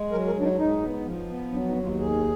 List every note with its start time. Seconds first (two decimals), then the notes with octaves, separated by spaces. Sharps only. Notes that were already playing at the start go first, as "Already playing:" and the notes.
Already playing: G#3
0.11 F#3 A#4
0.26 A#4
0.34 F#3 D4
0.43 D#4
0.58 G#2 D#4
0.82 B3
1.05 F3
1.28 B3
1.52 F#3 D4
1.68 D#4
1.76 D#2
1.83 F4
1.99 D#3 G#4